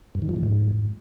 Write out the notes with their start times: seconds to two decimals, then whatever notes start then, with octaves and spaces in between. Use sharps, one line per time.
0.15 G2
0.22 D#3
0.29 F3
0.36 A2
0.43 G#2